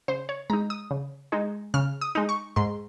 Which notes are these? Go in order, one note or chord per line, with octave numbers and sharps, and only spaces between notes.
C#3 C5
C#5
G#3 D#4 A#5
D#6
C#3
G#3 D#4
C#3 F6
D#6
G#3 D#4
C#6
G#2 C6